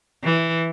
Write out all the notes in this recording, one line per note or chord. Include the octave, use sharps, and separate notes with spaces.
E3